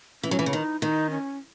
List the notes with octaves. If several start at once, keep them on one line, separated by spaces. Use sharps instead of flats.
E3 C#4
F#3
E3
C#3
D#3 D#4
D#3 D#4
C#4